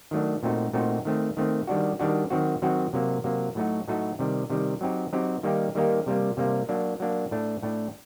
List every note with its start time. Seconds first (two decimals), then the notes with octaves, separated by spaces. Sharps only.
0.11 D#3 F#3 A3 D4
0.43 A#2 A3 C4 D#4 F#4
0.73 A#2 A3 C4 D#4 F#4
1.05 D#3 A3 C4
1.37 D#3 A3 C4
1.67 D#3 G3 D4 F#4
1.99 D#3 G3 D4 F#4
2.30 D#3 F#3 C4 F#4
2.62 D#3 F#3 C4 F#4
2.93 C3 F#3 A#3
3.24 C3 F#3 A#3
3.55 A2 F#3 A3 D#4 F#4
3.88 A2 F#3 A3 D#4 F#4
4.19 C3 D#3 G3
4.50 C3 D#3 G3
4.81 F#3 C4 D#4 G4
5.13 F#3 C4 D#4 G4
5.43 D#3 G3 A#3 D#4 G4
5.75 D#3 G3 A#3 D#4 G4
6.06 C3 G3 A#3
6.37 C3 G3 A#3
6.69 F#3 A#3 D4
7.00 F#3 A#3 D4
7.31 A2 A3 D4
7.63 A2 A3 D4